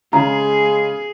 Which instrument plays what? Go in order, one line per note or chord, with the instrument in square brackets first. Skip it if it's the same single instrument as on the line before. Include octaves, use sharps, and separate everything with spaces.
[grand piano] C#3 [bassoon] G#3 [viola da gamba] G#4 [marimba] A#5